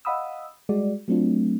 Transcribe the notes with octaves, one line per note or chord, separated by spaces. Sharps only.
D#5 F5 F#5 B5 D#6 E6
G3 G#3 F#4 D5
F#3 A3 C4 D4 F4